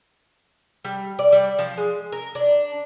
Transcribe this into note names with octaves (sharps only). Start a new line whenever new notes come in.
G3
D5
G3
F3
G#3
A#4
D4